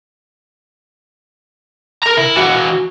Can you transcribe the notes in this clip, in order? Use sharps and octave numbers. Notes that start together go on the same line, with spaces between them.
A#4 A#5
E4
E3 F#4